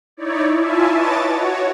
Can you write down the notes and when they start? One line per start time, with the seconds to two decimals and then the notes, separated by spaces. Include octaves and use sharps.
0.17 D#4 E4 C#5 D5
0.57 E4 F4 E5 G#5 A5
0.91 B4 C#5 D#5 A5 D6 A6
1.30 F#4 C#5